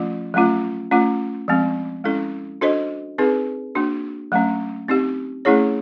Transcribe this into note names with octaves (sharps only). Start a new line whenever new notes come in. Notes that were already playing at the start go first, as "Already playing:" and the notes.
Already playing: F3 A3 C#4 F4
F#3 A3 C#4 F4
A3 C#4 F4
F3 G#3 C4
G#3 C#4 E4 A4
D4 F#4 A4 C5 D#5
C4 D#4 G#4 B4
A#3 D4 F#4
F#3 A3 C#4
C4 D#4 G4
A3 C#4 E4 G#4 C#5